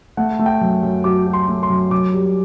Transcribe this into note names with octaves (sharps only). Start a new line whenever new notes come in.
A3 F#5
A3
G5
F#2
F#2
F#3 D6
F#3
C6
A3
C6
F#2
F#2 D6
G3